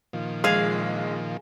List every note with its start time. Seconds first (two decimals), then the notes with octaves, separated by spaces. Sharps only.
0.13 A#2 D#3 F3
0.44 A#1 G#3 G#4 F5 F6